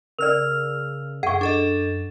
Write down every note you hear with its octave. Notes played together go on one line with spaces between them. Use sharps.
C#3 A#4 D5 E6 F6 F7
F#2 G#4 F#5 C#6
D4 A4 D#5